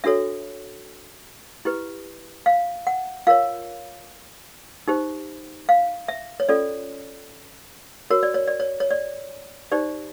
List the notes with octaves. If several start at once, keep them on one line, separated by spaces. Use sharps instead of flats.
D4 F#4 A4 C#5 E5
E4 G4 B4
F5
F#5
F4 A#4 C#5 F5
D#4 G4 C5
F5
E5
C#5
C#4 F4 A4 D5
F#4 A#4 C#5
D5
C#5
D5
C#5
C#5
D5
D#4 G4 C5 D5